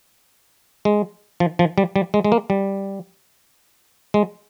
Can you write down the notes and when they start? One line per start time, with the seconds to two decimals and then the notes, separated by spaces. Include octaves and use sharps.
0.85 G#3
1.40 F3
1.59 F3
1.78 G3
1.96 G3
2.14 G#3
2.24 G#3
2.32 A#3
2.50 G3
4.14 G#3